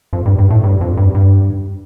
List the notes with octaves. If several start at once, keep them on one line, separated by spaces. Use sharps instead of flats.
F2
G2
G2
A2
G2
F2
G2
G2